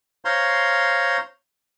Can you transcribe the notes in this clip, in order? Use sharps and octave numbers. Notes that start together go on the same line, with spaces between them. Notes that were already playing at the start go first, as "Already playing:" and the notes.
C5 C#5 F5 A#5 C6